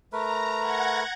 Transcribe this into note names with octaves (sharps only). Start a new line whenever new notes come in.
A3 A#4 B4 A#5
F#5 G#6 A#6